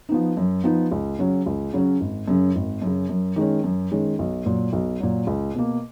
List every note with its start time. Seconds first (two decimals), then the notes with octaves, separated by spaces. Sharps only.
0.09 F3 B3 D#4
0.37 F#2
0.63 F3 B3 D#4
0.91 C#2
1.19 C#3 F#3 C#4
1.46 C#2
1.73 C#3 F#3 C#4
2.01 G#1
2.28 F#2 C#3
2.55 G#1
2.82 F#2 C#3
3.09 F#2
3.36 D#3 G#3 C#4
3.64 F#2
3.91 D#3 G#3 C#4
4.19 B1
4.46 A#2 F#3
4.73 B1
5.00 A#2 F#3
5.27 C#2
5.55 B2 A#3